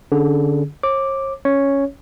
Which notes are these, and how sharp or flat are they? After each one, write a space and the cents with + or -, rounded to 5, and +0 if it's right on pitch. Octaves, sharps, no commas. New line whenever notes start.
D3 +0 C#4 +0 G#4 +15
C#5 -45 D6 +0
C#4 +0 C#5 +0